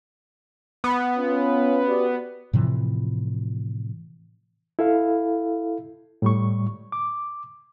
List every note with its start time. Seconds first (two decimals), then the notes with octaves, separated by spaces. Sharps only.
0.84 B3
1.17 C#4 F4
1.87 F#4 G4 D5
2.53 A2 C3 E3 F3
4.79 E4 A4 F5
6.22 A2 G3 C#6
6.92 D6